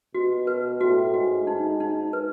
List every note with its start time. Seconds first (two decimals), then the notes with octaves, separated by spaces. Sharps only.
0.15 B2 F#4
0.47 B4
0.81 A2 F#4
1.14 G#2 F#4
1.47 D#4
1.80 D#4
2.13 B4